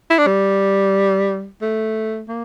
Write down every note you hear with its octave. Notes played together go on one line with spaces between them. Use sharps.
E4
D4
G3
A3
A#3